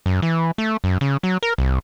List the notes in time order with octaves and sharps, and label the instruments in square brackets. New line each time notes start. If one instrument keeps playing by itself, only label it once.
[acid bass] F#2
E3
A3
F#2
C#3
F#3
A#4
C2